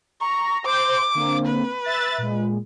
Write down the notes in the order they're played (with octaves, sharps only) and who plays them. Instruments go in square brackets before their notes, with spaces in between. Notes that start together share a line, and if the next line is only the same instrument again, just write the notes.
[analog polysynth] A#5 [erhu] C#6
[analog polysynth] C5 G6 [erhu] D6
[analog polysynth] D3 A#3 C4
[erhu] B4
[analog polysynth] E5 F#6 A6
A#2 G#3